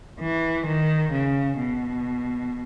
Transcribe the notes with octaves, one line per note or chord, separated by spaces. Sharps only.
E3
D#3
C#3
B2